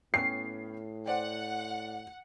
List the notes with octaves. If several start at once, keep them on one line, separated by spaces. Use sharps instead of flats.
A2 B3 C#4 G5 C7
C5 D5 F#5 G5